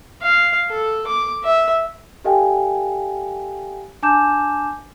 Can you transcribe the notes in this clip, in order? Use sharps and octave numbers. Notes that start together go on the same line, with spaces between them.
F5
A4
D6
E5
G4 A4 D#5 F5 G5 G#5
D4 G#5 A5 D6 G6 E7